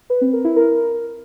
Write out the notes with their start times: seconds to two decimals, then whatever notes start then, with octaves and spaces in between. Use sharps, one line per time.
0.10 B4
0.21 C4
0.33 A#4
0.45 E4
0.56 A#4